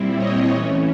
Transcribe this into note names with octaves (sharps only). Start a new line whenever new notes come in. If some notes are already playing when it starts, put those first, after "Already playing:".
Already playing: A#2 G3 C4 E4
C#5 D#5
E3 A3 C#4